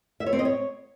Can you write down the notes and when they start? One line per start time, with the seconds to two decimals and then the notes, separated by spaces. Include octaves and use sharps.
0.20 E5
0.26 C#5
0.33 C4
0.39 D#5
0.45 C#5